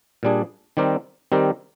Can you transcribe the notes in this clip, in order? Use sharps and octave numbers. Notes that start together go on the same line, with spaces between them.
A#2 G3 D4 G#4
D#3 G3 C4 G4 A#4
D#3 G3 C4 G4 A#4